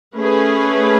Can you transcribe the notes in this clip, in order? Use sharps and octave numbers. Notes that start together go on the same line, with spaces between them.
A3 C#4 G#4 B4